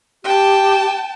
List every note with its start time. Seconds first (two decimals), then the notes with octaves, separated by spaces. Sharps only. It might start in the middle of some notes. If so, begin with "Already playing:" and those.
0.24 G4 G5 A5